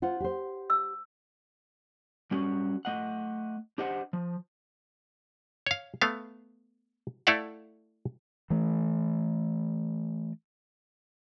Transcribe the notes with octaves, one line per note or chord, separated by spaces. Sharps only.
F4 C5 F#5
G4 C5
E6
G3 C#4 F#4
A3 D#5 F#5
D4 G4 C5 D#5 F#5
F3
C#5 F5
A3 B3 F5
A3 E4 A4 D5 F5 F#5
E3 A3